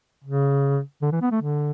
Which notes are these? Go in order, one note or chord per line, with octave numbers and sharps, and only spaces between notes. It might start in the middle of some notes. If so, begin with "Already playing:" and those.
C#3
D3
E3
B3
A3
D3